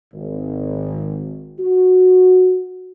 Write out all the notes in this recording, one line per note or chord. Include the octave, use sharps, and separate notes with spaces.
G#1
F#4